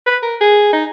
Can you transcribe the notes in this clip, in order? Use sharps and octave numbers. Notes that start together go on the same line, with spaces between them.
B4
A#4
G#4
D#4